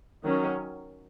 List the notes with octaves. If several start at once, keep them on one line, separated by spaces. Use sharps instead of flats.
D#3 F#3 C#4